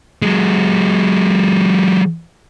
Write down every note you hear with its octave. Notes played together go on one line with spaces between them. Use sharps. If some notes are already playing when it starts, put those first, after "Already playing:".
F#3 G#3